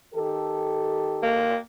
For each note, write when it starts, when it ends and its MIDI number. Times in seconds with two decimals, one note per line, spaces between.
0.14 1.47 51
0.14 1.47 67
0.14 1.47 69
1.23 1.58 58